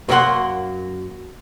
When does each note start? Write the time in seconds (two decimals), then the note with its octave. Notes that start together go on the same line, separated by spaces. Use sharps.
0.09 F#2 F#3 A#3 B3 F#5 C6